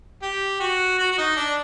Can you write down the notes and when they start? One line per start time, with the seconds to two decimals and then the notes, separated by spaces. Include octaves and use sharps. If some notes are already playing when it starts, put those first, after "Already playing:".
0.22 G4
0.60 F#4
0.99 F#4
1.12 F#4
1.18 D#4
1.37 D4